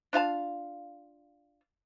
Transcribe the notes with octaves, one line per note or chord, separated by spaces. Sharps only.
D4 F4 F5 A5